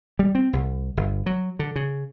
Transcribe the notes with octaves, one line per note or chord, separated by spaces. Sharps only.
G3
C4
C2
G1
F#3
D3
C#3